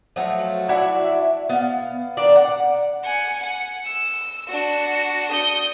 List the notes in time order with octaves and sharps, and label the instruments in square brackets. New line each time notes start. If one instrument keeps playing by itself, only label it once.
[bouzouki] F3 F#3 A3
D4 E4 F#4 E5
B3 F5
D#3 D4 D5
F#5
[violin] F#5 G#5
F#5
E6
D4 F#4
D#6 G6